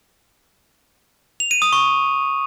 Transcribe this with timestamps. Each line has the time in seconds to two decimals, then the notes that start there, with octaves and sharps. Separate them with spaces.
1.40 F7
1.51 D#7
1.62 D#6
1.73 C#6